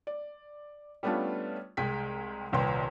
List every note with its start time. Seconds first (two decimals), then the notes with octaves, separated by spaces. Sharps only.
0.07 D5
1.03 G3 A3 B3 C#4 D4 F4
1.77 C2 G#3 G5 B6
2.52 D#1 C2 B4 G5 C6